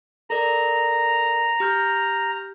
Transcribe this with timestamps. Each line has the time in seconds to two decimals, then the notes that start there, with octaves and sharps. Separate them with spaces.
0.30 A4 A#4 D5 A#5
1.60 G4 F6 G6